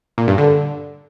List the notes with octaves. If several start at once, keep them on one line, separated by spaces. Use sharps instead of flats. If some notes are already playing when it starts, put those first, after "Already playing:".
A#2
G2
D3